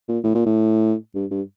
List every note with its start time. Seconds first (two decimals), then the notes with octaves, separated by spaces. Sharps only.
0.08 A#2
0.24 A2
0.35 A#2
0.46 A2
1.15 G2
1.31 G2